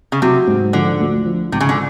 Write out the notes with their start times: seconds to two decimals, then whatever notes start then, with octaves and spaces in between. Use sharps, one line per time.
0.12 C#3
0.22 C3 F#3
0.47 G#2
0.73 D3 F3
1.00 D2
1.26 F3
1.52 G#1 C3
1.60 C#3
1.69 D3